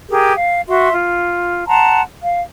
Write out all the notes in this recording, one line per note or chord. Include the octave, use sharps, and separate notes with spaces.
G4 G#4 A#4
F5
F#4 E5 C6
F4
F#5 A5 A#5 C6
F5